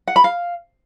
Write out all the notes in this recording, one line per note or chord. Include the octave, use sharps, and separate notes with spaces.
F#5
B5
F5